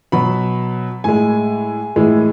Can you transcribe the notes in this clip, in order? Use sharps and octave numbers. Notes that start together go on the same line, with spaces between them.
B2 F#3 B5
A2 G#3 G#5
A2 E3 G#3